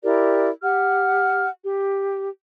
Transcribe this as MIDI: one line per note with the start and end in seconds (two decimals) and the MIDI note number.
0.02 0.49 64
0.02 0.49 67
0.02 0.49 70
0.02 0.49 74
0.62 1.46 67
0.62 1.46 78
0.62 1.46 89
1.63 2.29 67